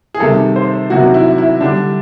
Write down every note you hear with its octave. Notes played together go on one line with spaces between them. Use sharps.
G#4
C3 D#3 G3 A4
C5
C3 D#3 F#3 F#4
E4
E4
D3 G3 D4